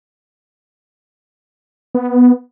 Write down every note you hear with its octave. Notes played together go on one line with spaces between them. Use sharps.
B3